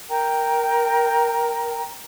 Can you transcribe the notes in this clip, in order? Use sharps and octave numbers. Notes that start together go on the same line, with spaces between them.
A#4 G5 A#5